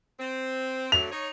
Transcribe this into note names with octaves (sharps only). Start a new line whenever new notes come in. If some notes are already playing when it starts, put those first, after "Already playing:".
C4
D3 F#3 A3 F7
D#4 C#5